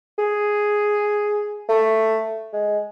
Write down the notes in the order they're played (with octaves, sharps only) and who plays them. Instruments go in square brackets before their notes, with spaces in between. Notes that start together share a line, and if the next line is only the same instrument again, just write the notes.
[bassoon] G#4
A3
G#3